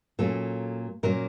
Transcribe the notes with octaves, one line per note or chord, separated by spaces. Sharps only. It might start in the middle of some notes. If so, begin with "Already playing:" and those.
A#2 F#3 A#3 C#4 A4
A#2 F#3 A#3 C#4 A#4